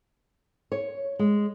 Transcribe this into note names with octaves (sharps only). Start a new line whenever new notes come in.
C#5
G#3